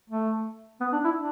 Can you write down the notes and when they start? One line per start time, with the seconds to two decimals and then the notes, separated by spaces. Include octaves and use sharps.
0.10 A3
0.80 B3
0.92 D4
1.04 E4
1.17 D4